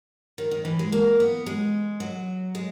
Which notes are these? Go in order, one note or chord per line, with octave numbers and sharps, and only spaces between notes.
D#3
D#3
E3
G#3
A#3
B3
G#3
F#3
G#3